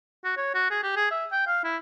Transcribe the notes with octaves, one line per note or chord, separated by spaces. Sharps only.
F#4
C#5
F#4
G#4
G4
G#4
E5
G5
F5
E4